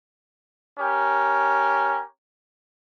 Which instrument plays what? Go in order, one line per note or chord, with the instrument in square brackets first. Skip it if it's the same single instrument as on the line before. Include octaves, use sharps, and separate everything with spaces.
[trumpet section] C#4 G4 A#4